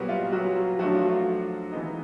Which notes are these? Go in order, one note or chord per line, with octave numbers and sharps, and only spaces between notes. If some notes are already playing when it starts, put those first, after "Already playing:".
Already playing: A#2 F#3 G3 B3 F#4
F4
F#3 F#4
F3 F#3 A3 D4 F#4
F4
F4
E3 G#3 B3 D#4